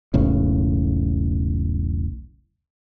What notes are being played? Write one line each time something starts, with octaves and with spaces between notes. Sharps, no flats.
E1 B1 A2 C#3